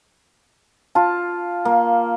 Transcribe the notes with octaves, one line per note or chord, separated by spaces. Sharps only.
F4 A5
A#3